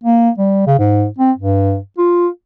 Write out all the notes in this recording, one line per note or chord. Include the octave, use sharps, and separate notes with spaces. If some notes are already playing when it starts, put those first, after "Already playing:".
A#3
G3
C#3
G#2
C4
G2
F4